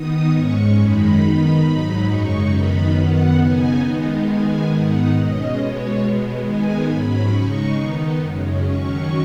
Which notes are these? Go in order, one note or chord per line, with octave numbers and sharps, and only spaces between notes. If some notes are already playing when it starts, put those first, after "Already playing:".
Already playing: D#3 B3 D#4 D#6
G#2 G#3 C#4 C#6
F#2 D#3 G#3 D#4 B5
D#3 B3 D#4 B5
G#2 F#3 D#4 B5
F#2 C#3 G#3 D#4 C#6
F#2 D#3 B3 D#4 B5
F#2 D#3 B3 F#5
C#3 B3 D#4 G#5
D#3 G#3 B3 D#4
D#3 G#3 B3 G#5
G#2 D#3 B3 D#4 F#5
B2 G#3 C#4 D#5
B2 G#3 B3 C#5
B2 G#3 B3
D#3 G#3 B3 D#4 G#5
G#2 F#3 C#4 B5
C#3 G#3 D#4 C#6
D#3 B3 D#4
F#2 C#3 G#3 C#4
D#3 F#3 C#4 C#6